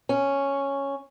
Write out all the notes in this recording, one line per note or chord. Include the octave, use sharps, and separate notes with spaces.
C#4